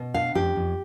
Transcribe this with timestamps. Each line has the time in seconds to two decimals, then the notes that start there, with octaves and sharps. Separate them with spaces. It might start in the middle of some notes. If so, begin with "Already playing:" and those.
Already playing: B2
0.14 D4 F5
0.35 F2 G4
0.56 F2